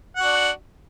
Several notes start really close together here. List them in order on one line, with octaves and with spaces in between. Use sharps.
F#5 F#4 D4